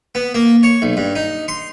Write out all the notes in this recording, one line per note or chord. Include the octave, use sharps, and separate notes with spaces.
B3
A#3
C#5
B1
G2
D#4
C6